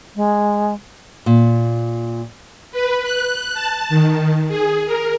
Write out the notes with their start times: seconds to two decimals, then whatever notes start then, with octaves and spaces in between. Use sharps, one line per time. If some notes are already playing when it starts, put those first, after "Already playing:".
0.15 G#3
1.26 A#2
2.72 B4
3.01 F#6
3.54 A5
3.89 D#3
4.48 G#4
4.86 A#4